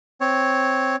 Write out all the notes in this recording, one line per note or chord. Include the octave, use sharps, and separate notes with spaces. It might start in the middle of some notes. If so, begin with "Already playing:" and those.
C4 C#5